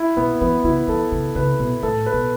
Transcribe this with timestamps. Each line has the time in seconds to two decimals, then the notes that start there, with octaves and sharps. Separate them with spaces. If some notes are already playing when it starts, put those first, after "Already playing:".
Already playing: E4
0.17 B2 B3
0.41 E3 B3
0.64 C#3 E4
0.88 E3 A4
1.12 C#3
1.35 C#3 B4
1.59 B2
1.82 A2 A4
2.06 B4
2.13 B2